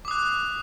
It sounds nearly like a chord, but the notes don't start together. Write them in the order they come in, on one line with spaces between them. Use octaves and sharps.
D6 D#6 F#6